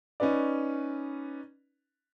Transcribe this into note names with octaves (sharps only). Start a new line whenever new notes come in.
C#4 D#4 B4 D5